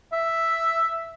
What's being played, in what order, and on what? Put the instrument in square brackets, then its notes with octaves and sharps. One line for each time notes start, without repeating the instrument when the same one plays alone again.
[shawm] E5